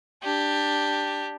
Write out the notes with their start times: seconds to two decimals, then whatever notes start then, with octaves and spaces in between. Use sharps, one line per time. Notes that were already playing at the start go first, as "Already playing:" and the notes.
0.23 D4 G4